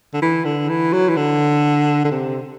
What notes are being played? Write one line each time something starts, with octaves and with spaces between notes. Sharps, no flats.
D3
E3
D3
E3
F#3
E3
D3
D3
C3